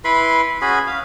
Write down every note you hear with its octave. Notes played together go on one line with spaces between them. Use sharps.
E4 B4 B5 C6
C#4 F#4 G#4 B5
F5